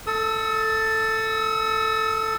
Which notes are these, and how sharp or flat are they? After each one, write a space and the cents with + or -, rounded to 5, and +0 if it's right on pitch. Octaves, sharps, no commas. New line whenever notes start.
A4 +10 E6 -45